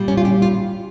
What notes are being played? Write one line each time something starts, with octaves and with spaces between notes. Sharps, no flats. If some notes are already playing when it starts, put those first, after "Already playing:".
Already playing: A#2 G3
C#4
F4
G4
F4